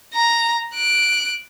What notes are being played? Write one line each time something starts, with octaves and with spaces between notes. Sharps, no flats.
A#5
F#6 D7